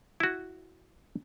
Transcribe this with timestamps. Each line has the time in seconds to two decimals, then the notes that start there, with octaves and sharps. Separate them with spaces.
0.20 E4 F#4